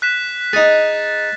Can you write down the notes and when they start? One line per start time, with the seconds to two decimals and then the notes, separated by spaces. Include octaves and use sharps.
0.02 F#6 B6 E7
0.53 D#4 G#4 A6 A#6